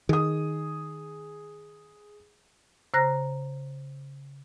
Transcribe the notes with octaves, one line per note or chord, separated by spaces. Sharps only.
D#3 G#4 D#6
C#3 C5 A#5 F#6 A#6